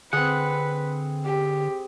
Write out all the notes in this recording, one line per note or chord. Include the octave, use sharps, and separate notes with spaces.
D3 C4 G#4 B4 F#5
G4